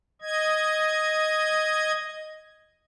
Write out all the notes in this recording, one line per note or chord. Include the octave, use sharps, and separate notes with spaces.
D#5 G#6